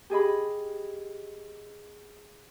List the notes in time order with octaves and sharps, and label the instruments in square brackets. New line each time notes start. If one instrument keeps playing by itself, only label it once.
[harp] G4 G#4 D#5 B5